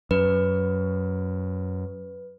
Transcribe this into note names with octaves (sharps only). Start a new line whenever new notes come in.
F#2 B4